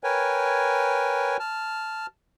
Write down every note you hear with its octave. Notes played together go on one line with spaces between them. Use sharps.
A#4 B4 C#5 G5 G#5
A5 F6